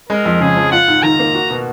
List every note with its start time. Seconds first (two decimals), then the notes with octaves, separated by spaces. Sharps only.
0.09 G#3 A#4
0.25 F2
0.41 C#3 G#4
0.57 F3
0.71 F4 F#5
0.88 G#2
1.03 D#3 A#5
1.19 A#3
1.35 F#4
1.50 B2